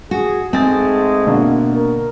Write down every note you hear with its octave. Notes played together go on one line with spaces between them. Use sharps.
F#4 G#4
G#2 G#3 A3 C4 G#5 D#6 A6
B2 D3 A#3
A#4